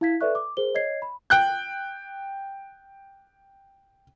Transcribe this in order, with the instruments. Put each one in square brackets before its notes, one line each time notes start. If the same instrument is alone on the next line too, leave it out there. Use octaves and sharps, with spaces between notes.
[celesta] E4 F5 G#6 B6
A4 B4 D5 E5 C#6 F#6
D6
G#4 A#4 C5 G7
C#5 D#5 G#6 C7
B5
[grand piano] G5 F#6 G6